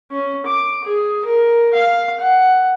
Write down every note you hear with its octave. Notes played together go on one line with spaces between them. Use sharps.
C#4
D6
G#4
A#4
F5
F#5